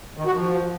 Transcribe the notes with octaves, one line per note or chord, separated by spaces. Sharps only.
D#3
F#4
F3